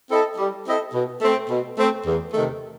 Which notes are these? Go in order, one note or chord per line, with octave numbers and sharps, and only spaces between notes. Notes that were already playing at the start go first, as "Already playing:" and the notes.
C4 E4 A4 D#5
G3
C4 E4 A4 D#5
B2
A3 C4
B2
A3 C4
E2
C3 D#3 A3